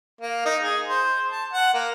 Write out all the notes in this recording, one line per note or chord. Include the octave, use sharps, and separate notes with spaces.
A#3
D#4
G#4
C5
A5
F#5
A#3